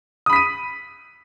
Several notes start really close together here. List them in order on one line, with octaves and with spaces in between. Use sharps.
D#6 B5 B6 D#7